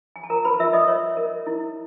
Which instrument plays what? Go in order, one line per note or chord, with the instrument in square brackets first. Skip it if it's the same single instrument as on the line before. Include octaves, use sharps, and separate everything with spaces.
[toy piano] G#5
A5
F4 A#4 A#5
B4 B5
F4 E5 E6
D#5 D#6
C#5
A#4
E4